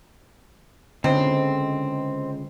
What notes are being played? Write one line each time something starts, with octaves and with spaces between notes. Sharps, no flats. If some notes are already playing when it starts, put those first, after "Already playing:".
C#2 D3 C4